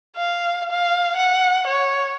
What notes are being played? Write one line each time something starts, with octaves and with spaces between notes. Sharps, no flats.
F5
F5
F#5
C#5